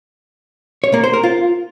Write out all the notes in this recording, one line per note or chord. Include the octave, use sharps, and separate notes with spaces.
C#5
A#3
C5
A#4
F4